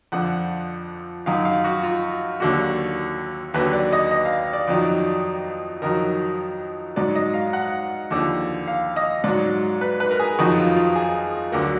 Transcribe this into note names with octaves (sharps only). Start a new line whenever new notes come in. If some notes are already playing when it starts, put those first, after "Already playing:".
F2 D3 F3 F#5
F#2 D#3 F#3 F5
F5
F#4
F4
D#2 D3 F#3 F#4
D#2 D3 F#3 B4
D5
D#5
D#5
F5
D5
F2 D#3 F#3
F2 D#3 F#3 A#4
G#2 F#3 D5
D#5
F5
F#5
D#2 D3 F3
F5
D#5
G#2 F#3 D5
B4
B4
A#4
G#4
F2 D#3 F#3 F#4
F4
F4
G#4
D2 D3 F#3 A#4